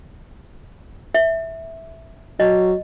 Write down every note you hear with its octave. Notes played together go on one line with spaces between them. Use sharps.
E5
F#3 D#5